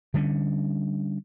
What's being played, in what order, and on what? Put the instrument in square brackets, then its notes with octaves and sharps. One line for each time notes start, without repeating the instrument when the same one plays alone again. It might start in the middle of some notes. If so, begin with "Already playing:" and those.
[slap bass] D3 G3 A#3 C#4